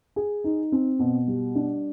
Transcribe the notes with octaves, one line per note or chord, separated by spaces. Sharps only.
G#4
D#4
C4
B2
G3
D4